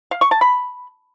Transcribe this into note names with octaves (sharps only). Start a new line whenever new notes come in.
F5
C#6
A5
B5